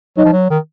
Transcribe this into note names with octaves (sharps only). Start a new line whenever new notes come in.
F#3 D#4
F3
F#3
D#3